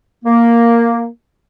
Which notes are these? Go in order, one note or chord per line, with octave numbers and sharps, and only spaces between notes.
A#3